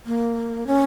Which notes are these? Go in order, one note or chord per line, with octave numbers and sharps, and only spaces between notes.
A#3
C#4